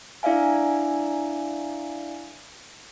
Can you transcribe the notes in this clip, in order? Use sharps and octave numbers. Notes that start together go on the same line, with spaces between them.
D4 E4 D5 E5 F5 G#5